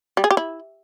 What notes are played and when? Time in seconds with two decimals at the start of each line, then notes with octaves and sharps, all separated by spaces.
0.17 G3
0.24 G#4
0.31 G4
0.37 E4